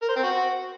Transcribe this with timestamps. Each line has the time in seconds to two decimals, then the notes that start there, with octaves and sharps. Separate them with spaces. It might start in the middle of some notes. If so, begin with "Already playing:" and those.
0.02 A#4
0.09 C5
0.16 C4
0.23 F#4